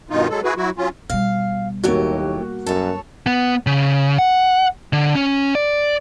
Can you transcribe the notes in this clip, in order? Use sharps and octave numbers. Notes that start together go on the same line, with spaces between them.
G2 B2 D#3 D#4 F4
F#3 G#3 A4
E4 F#4 G#4 B4
F#3 E4 F#4
F#3 C#4 F4
B2 G3 F5
D#2 A2 F#3 A#3 F#4 G4
F#2 A4 C#5
B3
C#3
F#5
D3
C#4
D5